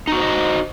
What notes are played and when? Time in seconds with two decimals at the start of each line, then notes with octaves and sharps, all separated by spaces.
0.07 D#4
0.12 F#4
0.17 C5
0.22 D#5